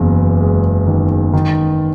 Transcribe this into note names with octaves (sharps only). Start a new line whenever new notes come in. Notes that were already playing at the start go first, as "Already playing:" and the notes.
Already playing: F#1 E2
G#3
D#3
D#3